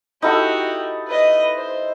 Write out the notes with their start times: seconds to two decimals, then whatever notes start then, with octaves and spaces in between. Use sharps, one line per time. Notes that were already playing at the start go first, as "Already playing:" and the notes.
0.22 D#4 E4 F#4 G4 A4
1.08 B4 D#5
1.56 C5